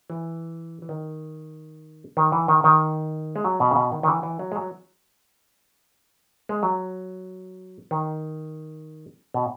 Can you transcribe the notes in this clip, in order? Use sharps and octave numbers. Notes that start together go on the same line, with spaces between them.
E3
E3
D#3
D#3
E3
D#3
D#3
G#3
F#3
B2
C#3
B2
D#3
D#3
E3
E3
F#3
G#3
F#3
G#3
F#3
D#3
B2